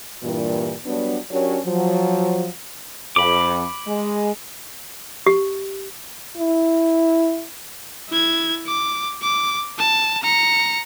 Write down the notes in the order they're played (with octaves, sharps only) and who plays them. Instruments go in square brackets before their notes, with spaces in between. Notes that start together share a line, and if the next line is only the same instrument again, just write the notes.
[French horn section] G2 A#2 E3
F#3 G3 B3 D4
F#3 C#4 D4 G4 A#4 C#5
F3 F#3
[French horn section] F2 [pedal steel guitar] B5 D6
[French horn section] G#3
[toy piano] G4
[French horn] E4
[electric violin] E4 G#6
D6
D6
A5
A#5 C#7